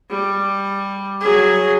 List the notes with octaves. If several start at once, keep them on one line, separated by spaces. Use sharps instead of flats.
G3
F#3 G#4